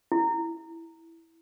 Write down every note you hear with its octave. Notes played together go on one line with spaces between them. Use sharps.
E4